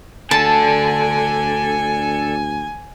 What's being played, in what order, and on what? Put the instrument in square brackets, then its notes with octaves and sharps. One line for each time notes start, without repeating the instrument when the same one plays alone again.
[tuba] D2 [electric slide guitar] D4 A4 [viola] G#5 [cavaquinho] A5